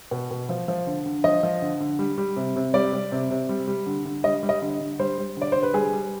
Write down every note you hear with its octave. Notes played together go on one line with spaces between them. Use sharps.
B2
B2
F3
F3
D3
D3
F3 D#5
F3
D3
D3
G3
G3
C3
C3
G3 D5
G3
C3
C3
G3
G3
D3
D3
G3 D#5
G3
D#5
D3
D3
G3 C5
G3
D3 D5
D3 C5
B4
G3 G#4
G3